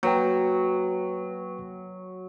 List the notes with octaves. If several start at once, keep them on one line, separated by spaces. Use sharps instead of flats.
F#3 A#3 B4 G5